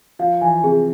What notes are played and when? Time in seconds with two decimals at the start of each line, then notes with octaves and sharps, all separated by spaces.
0.19 F3 F5
0.41 E3 G#5
0.63 C3 G#4